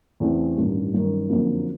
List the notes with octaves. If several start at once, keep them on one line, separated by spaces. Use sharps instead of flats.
E2 C#3 E3 A3 C4
A1 G2 D#3
G1 F#2 D#3
F#1 F2 D3 F#3 A#3